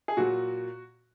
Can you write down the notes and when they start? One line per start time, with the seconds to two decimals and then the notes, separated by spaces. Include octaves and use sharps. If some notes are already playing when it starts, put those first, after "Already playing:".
0.08 G#4
0.17 A#2 F#3 F#4